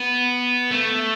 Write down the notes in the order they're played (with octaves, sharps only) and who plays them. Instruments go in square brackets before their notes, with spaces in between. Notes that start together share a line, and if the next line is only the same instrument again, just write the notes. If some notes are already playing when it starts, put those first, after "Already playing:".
Already playing: [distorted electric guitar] B3
A3